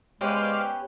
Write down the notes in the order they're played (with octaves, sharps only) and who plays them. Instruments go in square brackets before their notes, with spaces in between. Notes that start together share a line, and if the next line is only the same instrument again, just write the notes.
[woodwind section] G#3 [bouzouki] B3 C#4 G4 [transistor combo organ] C5 D5 F5